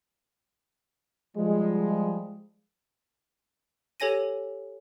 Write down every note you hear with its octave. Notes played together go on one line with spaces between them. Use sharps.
F3 G3 G#3
G4 A4 C#5 G#5 A#6 D#7